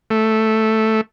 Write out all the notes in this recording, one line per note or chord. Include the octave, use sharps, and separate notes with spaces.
A3